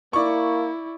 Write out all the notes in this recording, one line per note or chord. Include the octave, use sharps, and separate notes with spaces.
A#3 E4 D5 C#6